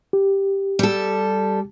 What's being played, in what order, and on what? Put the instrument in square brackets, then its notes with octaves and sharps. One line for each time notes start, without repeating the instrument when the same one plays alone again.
[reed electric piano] G4
[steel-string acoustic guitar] G3 A4